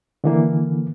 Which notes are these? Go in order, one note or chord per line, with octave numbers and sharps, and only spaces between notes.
D3 E3 A#3